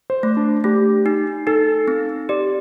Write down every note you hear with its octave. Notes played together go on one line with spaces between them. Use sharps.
C5
A3
D4
A3 G4
D#4
D#4 A4
C4
G4 D5